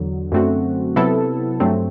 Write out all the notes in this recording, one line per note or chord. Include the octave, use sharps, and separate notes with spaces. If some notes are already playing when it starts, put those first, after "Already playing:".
Already playing: E2 D3 F#3
F#2 D3 A3 C4 F#4
C3 F#3 B3 E4 A4
G2 F#3 A3 C4